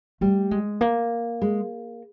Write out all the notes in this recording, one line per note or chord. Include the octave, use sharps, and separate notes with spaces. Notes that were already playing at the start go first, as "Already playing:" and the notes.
G3 A3
G#3
A#3
G#3